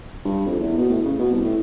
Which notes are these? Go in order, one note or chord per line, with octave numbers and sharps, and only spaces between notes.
G2
F2
E2
B2
A2
C#3
B2
C2
A2